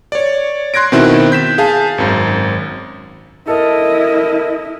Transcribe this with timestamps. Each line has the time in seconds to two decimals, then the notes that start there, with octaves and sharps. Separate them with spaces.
0.12 C#5 D5
0.74 C6 F#6 G#6 A#6 D7
0.92 B2 D#3 C4 E4
1.32 G6 B6 E7
1.58 G#4 F5 A5
1.98 G#1 F#2
3.47 E4 A4 A#4 D#5